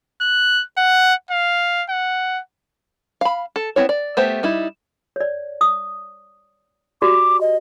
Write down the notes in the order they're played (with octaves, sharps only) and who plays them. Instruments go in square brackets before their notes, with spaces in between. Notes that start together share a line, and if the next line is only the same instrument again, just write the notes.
[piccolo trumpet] F#6
F#5
F5
F#5
[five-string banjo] F5 B5
A4
B3 C4 E4 C#5
D5
A3 B3 G4 C5 E5
G3 D#4 E4
[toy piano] C#5 D5
D#6
[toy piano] F#4 G4 D5 [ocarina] D6
[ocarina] D#5